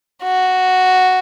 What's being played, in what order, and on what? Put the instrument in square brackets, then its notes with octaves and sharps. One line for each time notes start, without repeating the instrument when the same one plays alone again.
[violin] F#4